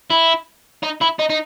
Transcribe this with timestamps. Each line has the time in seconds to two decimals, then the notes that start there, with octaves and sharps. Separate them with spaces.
0.10 E4
0.83 D#4
1.01 E4
1.19 D#4
1.30 D#4